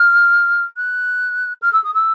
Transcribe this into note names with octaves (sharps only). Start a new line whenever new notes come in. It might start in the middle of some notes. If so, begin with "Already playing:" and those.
Already playing: F6
F#6
F6
E6
D#6
E6